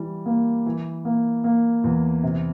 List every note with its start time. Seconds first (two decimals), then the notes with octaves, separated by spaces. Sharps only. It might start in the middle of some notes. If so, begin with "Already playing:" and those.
Already playing: E3 G3
0.26 A#3
0.66 E3
1.05 A#3
1.44 A#3
1.84 E2
2.23 C3